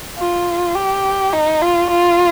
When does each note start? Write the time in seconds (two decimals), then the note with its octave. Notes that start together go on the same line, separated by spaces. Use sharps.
0.18 F4
0.76 G4
1.33 D#4
1.61 F4
1.90 F4